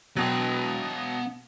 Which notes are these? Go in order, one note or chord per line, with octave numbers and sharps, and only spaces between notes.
B2 F#3 B3 G5